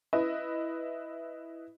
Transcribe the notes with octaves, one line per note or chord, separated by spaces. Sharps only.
E4 B4 D#5 E5